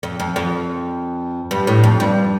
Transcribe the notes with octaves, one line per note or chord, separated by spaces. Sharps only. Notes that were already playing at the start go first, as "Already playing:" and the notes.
F2
F2
F2
G2
A2
F2
G2